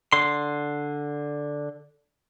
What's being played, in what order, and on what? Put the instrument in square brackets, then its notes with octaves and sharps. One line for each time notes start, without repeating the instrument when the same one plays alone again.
[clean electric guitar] D3 C6